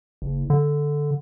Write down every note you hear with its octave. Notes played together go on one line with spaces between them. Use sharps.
F#1
D3